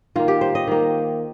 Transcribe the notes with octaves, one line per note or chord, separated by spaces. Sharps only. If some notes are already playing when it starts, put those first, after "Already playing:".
D#3 A#3 F4
G4
C5
D#5
D#3 A#3